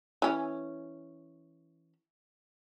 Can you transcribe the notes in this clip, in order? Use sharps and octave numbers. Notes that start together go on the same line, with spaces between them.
E3 C#4